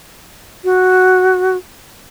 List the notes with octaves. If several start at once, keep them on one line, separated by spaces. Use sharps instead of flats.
F#4